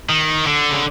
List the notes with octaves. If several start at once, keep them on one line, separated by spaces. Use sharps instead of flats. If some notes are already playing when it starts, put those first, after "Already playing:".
D#3
D3
C#3